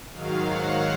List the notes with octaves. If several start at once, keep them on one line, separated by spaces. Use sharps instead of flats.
G#2 D#3 F#3 F5
F#5